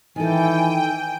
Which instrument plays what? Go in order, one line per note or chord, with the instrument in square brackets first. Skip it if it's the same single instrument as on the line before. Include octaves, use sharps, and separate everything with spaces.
[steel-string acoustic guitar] D#3 A4 [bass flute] E3 [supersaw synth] G5 [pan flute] G#5